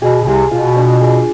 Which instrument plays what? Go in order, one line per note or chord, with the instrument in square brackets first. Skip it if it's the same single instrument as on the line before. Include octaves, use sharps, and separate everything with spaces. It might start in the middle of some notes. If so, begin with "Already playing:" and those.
[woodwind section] B2 [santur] G#4
[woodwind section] B2
[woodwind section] C2 C3 [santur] G#4
[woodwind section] B2 [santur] F4
[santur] D4
G#4